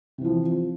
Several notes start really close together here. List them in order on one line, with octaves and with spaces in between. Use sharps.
C3 E3 F3